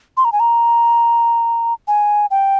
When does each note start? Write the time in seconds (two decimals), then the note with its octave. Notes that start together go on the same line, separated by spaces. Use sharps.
0.17 C6
0.25 A#5
0.32 G#5
0.40 A#5
1.88 G#5
2.31 G5